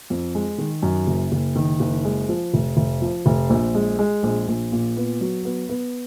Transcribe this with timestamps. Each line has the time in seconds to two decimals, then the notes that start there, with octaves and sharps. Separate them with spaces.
0.10 F2
0.35 G#3
0.58 D#3
0.83 F#2
1.07 F#1
1.32 F#1
1.56 D#3
1.80 F#1
2.05 G#3
2.29 F3
2.54 F1
2.77 F1
3.02 F3
3.26 F1
3.50 A#1
3.75 G#3
3.99 G#3
4.23 A#1
4.48 A#1
4.72 A#2
4.97 B3
5.21 F#3
5.45 B3
5.69 B3